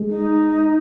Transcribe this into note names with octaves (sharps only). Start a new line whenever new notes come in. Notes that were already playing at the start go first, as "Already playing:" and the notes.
Already playing: G#3
D#4